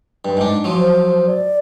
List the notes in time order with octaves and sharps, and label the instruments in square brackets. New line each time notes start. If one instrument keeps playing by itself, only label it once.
[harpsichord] G2
G#2 D4
F3 F#3
[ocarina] C5
D5